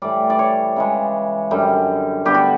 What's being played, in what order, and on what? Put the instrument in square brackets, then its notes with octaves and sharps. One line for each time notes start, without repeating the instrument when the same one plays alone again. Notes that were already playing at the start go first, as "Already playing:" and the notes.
[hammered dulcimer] A2 E3 G3 D5
D5
C#5
C#3 E3 G#3
F#2 D3 G3
D3 G3 B3 G4
F#4